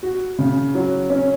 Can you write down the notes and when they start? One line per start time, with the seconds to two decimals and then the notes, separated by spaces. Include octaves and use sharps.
0.03 F#4
0.39 C#3
0.75 F#3
1.10 C#4